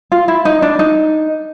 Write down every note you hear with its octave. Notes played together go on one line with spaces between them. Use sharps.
F4
E4
D#4
D4
D#4